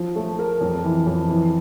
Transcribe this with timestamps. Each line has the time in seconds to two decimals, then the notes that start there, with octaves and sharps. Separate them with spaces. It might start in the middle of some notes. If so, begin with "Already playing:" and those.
Already playing: F3
0.16 A3
0.39 A#4
0.61 F2
0.84 E3
1.07 F2
1.29 E3